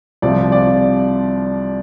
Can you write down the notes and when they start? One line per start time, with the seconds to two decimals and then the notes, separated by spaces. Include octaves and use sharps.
0.22 C2 C3 F3 C4 F4 D5
0.52 D5